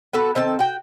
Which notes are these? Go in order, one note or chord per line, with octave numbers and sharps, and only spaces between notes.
B3 F#4 A4 B4
D#3 C4 A4 A5
F#4 G5